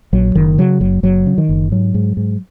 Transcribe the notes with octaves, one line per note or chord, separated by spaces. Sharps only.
A#1 F#3
F#1 D#3
C#3 F#3
F#1 F#3
F#1 F#3
C#3
D#3
F#1
G#2 F#3
G#2
G#2